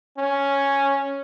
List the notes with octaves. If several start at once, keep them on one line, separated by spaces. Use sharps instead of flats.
C#4